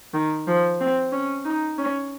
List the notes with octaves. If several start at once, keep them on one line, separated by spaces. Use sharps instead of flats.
D#3
F3
C4
C#4
D#4
C#4